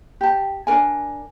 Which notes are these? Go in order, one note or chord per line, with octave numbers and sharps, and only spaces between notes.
G4 A5
D4 A#4 G#5